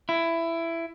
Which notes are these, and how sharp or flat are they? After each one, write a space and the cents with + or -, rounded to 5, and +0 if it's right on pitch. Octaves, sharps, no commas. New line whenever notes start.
E4 +15